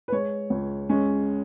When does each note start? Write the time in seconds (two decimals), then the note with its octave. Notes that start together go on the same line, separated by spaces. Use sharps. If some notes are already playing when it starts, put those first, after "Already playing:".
0.08 B4
0.12 G#3 C#5
0.50 C#2
0.89 G#3 C#4